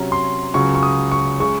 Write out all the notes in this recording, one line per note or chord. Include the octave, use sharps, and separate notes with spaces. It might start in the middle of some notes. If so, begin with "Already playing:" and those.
Already playing: C3 F#3 C#4 A#5
C6
C#2 C#3 F#3 C#6
C#6
D#6
C#6
C#3 G#3 C#6